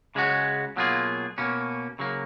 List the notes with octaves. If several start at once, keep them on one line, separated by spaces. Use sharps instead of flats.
C#3 G#3 C#4 F#4
B2 F#3 A#3 F4 G#4
B2 A#3 C#4
C#3 F#3 A#3